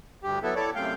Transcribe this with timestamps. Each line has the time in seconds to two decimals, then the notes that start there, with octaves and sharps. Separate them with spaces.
0.23 D2 G2 G4
0.43 F#3 B3 E4 A4
0.56 E4 A4 C#5 D5
0.75 F#2 C3 A3 F5 G5